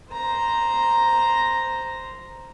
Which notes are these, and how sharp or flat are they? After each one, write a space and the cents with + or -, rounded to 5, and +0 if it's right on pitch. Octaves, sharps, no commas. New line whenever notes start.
C5 -5 A#5 +0